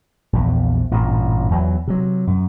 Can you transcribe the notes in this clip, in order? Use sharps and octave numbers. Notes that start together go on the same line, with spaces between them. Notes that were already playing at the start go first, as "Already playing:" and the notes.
A#1 E2
A1 G2 A#2
E2 E3 F#3
C3 F#3
F#2